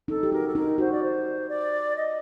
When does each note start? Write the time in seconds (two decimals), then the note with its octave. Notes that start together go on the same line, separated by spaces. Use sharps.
0.08 D#4 A4
0.23 G4
0.32 F#4 A#4
0.47 A4
0.55 D#4 A#4
0.78 F#4 C5
0.91 D5
1.02 C5
1.48 D5
1.96 D#5